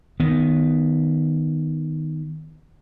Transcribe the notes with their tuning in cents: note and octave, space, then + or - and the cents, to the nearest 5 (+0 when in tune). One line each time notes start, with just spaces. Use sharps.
D#3 +0 B3 +0